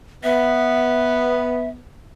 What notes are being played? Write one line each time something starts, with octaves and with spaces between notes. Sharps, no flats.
B3 E5